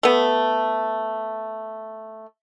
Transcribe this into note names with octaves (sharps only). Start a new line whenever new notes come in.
A3 B3